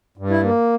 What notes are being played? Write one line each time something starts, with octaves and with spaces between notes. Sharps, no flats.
G2
E4
A#3